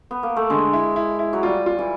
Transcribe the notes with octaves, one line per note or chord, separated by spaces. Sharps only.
B3
A#3
A3
D3 G#3
E4
E4
E4
F#3
G3 F4
F4
E3